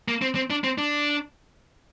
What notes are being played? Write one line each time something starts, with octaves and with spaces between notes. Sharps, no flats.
A#3
C4
C4
D4
C4
D4